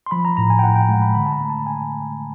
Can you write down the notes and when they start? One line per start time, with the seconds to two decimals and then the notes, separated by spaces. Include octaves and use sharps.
0.06 C6
0.11 F3 B5
0.25 A#5
0.37 A2 A#5
0.50 G#5
0.59 G5
0.63 A2 F#5
0.76 G5
0.89 G#3
1.02 B5
1.14 D3 B5
1.26 A5
1.32 A#5
1.41 A3
1.50 A5
1.67 G#5